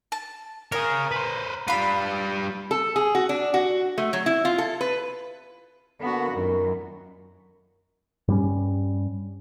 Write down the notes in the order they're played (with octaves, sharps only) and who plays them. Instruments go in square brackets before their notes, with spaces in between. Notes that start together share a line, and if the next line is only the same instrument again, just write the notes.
[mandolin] A5
[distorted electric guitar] G#4 C#5 [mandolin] A#4
[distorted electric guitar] B4 C5
[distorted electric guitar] G3 B4 [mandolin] F4 B5
[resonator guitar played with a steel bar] A4
G#4
F#4
D4
F#4
A3
F#3
E4
F4
A4
B4
[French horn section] D3 A#3 [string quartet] B3 F#4
[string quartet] F#2 [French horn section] A#2 D#3 A#4
[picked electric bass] G2 G3 C#4